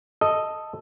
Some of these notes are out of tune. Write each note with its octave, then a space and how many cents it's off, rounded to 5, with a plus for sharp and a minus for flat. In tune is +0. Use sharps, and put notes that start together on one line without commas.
A4 +5 D#5 +0